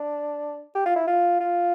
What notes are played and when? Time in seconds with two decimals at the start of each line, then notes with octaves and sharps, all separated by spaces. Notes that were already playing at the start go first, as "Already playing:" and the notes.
Already playing: D4
0.75 G4
0.86 F4
0.96 E4
1.07 F4
1.40 F4